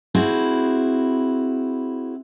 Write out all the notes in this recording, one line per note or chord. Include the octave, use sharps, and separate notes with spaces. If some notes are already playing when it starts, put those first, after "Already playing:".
C4 E4 F#4 G#4